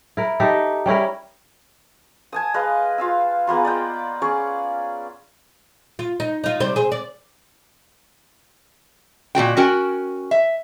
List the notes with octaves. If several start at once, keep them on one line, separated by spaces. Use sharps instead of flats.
E4 A#4
D#4 G4 A4 E5
G3 C#4 E4 A#4
G#5 A5 D#6
G#3 B4 D#5 F5
F4 F5 E6
G#3 A#3 B3 F4
D5 D#5 G5
C#4 G#4 D5 C#6
F4
D#4
D#4 F4
C3 G3 C5
G#4 C5
D5
A#2 A3 F#4 G5
C#4 F#4 A#4 G5
E5